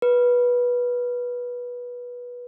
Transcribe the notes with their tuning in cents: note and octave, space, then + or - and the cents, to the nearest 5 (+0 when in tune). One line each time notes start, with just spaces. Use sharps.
B4 -15